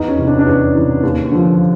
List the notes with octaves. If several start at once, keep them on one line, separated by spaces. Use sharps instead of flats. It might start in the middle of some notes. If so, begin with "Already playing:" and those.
Already playing: E2 D#4
C#4
C3 E3
D4
D4
E2 C#4
C3 E3
D#2
D3 F3